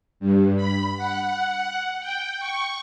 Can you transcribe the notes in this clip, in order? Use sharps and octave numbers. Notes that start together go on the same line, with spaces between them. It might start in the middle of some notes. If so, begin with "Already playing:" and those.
G2
B5
F#5
G5
C#6